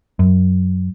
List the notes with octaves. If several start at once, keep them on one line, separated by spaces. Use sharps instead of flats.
F#2